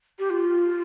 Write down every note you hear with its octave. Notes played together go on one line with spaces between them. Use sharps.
G4
F4